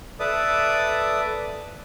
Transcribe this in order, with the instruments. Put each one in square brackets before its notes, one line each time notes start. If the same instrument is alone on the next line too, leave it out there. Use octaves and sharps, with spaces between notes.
[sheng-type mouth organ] A4 B4 D5 E5 D6 D#6